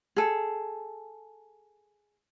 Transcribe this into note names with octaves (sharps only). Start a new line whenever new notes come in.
G#4 A4